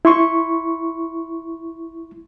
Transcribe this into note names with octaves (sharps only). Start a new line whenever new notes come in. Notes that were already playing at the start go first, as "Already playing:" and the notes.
E4 C6 C#6